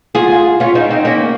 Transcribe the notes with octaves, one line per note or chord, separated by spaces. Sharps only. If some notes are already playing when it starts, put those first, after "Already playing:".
F4 G#4
C#4 F4
C4 D#4
C4 D#4
A#3 C#4